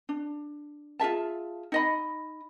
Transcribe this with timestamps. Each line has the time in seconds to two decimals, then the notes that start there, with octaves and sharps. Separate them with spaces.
0.09 D4
0.99 F4 G#4 E5 A5
1.72 D#4 D#5 B5